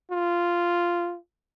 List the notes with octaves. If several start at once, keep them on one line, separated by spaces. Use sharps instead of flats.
F4